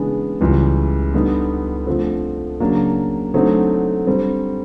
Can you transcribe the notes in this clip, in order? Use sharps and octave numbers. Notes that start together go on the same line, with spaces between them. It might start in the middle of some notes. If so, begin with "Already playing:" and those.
Already playing: C#3 E3 G#3 B3 D4
C#2 C#3 E3 G3
D3 G3 B3 D#4
D3 F3 A3 C4
C#3 F#3 A#3 D4
D3 F#3 A3 C4 D#4
D3 G3 C4